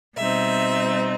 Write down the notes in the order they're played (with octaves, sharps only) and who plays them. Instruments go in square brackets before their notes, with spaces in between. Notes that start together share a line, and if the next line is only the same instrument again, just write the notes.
[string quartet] B2 G3 C4 D#4 E5